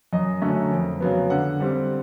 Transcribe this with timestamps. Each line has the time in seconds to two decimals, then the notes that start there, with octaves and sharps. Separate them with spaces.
0.13 F#2 D#5
0.41 D3 F#3 A3 C#4
0.72 F2
1.01 C#3 F#3 B3
1.30 D3 F#5
1.60 G3 C4